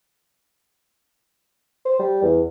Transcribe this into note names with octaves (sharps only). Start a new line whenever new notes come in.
C5
G3
E2